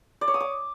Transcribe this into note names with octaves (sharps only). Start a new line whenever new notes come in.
D5
C#5
D#6
D6